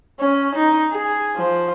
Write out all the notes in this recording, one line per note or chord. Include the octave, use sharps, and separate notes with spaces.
C#4
D#4
G#4
F3